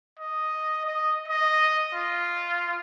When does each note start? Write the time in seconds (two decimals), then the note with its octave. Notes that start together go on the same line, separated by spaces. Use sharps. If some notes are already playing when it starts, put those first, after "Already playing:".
0.19 D#5
0.86 D#5
1.28 D#5
1.93 F4